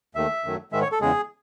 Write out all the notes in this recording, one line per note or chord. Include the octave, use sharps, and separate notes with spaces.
D#2 D#3 A3 E5
F#2 D#3 F#3 A3
G#2 D#3 G#3 E5
C#5
A4
E2 C#3 G#3 G#4